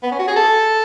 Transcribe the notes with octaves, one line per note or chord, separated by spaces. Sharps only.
B3
C#4
F#4
G#4
A4